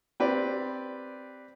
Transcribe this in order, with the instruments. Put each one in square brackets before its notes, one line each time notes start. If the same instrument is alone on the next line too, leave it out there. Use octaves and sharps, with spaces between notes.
[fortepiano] C4 G4 B4 D5